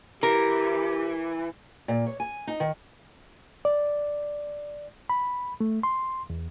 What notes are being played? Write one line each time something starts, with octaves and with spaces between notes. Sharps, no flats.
E3 G4 A#4
A#2
C#5
G#5
D#4
D#3
D5
B5
A3
C6
E2